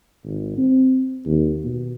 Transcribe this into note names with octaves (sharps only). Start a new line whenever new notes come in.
G#1
C4
D#2
B2